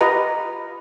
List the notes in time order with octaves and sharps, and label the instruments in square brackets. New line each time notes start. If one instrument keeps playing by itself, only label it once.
[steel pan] F4 G4 B4 D#5 A#5